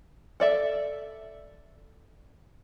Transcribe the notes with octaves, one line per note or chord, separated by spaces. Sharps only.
A4 D5 E5